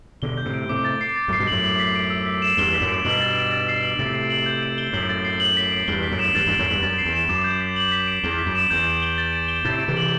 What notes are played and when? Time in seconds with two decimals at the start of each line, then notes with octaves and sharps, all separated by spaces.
0.22 B2 D3 G7
0.37 G6
0.45 A2 C3
0.54 D7
0.69 A2 C3 D6
0.85 A6
1.01 C7
1.16 A6
1.28 F#2 A2 C7
1.39 G2 B2
1.48 F#2 A2 F#7
1.64 F#7
1.79 B6
1.96 D7
2.10 E6
2.26 B6
2.42 E7
2.57 E2 G2 G7
2.74 B6
2.81 F#2 A2
2.89 D7
3.05 G2 B2 F#7
3.21 A6
3.37 D7
3.52 A6
3.68 C7
3.83 F#7
3.99 A2 C3 A6
4.14 D7
4.30 F#7
4.46 G6
4.63 D7
4.78 G7
4.93 F#2 A2 F#7
5.09 A6
5.25 C7
5.40 F#7
5.57 B6
5.72 D7
5.88 E2 G2 G7
6.03 B6
6.11 F#2 A2
6.19 E7
6.35 E2 G2 A6
6.46 E2 G2 D7
6.59 F#2 A2
6.66 E2 G2 F#7
6.82 F#2 A6
6.98 C7
7.05 E2
7.13 E7
7.29 F#2 D6
7.44 G6
7.60 B6
7.76 F#7
7.92 B6
8.08 D7
8.24 E2 G7
8.38 B6
8.46 F#2
8.55 E7
8.70 E2 G6
8.87 D7
9.02 G7
9.18 A6
9.33 D7
9.48 G7
9.65 A2 C3 A6
9.80 D7
9.88 C3 E3
9.97 F#7